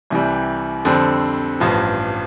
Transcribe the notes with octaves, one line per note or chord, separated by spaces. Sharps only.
C2 C3 E3 G3
F2 D3 G3 C4
A1 G2 F3